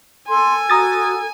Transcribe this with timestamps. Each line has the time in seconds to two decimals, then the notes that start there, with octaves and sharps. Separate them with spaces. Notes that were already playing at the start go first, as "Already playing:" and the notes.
0.28 A4 G#5 C6
0.70 F#4 A#5 D#6 A6